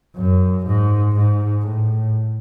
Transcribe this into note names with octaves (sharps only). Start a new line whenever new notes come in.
F#2
G#2
G#2
A2